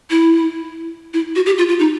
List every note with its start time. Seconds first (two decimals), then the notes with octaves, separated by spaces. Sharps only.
0.11 E4
1.14 E4
1.36 F#4
1.46 G4
1.58 F4
1.69 F4
1.80 D#4